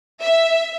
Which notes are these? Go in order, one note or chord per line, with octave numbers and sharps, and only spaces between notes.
E5